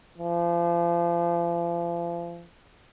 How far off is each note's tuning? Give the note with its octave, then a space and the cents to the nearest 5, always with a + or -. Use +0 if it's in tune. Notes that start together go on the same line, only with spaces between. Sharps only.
F3 -35